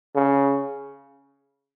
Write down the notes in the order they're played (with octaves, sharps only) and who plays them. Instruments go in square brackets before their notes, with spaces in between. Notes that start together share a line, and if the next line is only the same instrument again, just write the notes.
[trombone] C#3